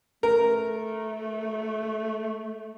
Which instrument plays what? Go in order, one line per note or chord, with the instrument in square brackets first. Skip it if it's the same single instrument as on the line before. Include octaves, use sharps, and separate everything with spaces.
[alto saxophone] A3 [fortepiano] A#4